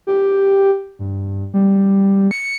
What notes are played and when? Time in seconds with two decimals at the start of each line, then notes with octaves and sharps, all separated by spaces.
0.07 G4
0.99 G2
1.54 G3
2.31 C#7